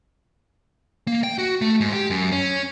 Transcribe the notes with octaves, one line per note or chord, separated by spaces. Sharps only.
A#3
G5
F#4
A3
G#2
G4
F#2
C#4